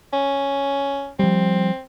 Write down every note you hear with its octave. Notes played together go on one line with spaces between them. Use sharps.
C#4
F3 G3 C4